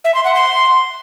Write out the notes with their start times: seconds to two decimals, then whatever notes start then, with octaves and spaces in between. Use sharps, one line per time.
0.05 E5
0.15 C6
0.25 F#5
0.35 C6